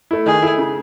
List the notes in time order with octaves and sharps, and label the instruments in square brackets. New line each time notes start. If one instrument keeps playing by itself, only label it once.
[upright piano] A3 E4
[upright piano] D#3 [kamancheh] G#4
[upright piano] A3 E4
C#3